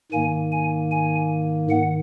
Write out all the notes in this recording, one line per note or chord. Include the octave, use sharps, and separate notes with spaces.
G#2 D#3 A#3 G#5
G#5
G#5
G#2 D#3 F#5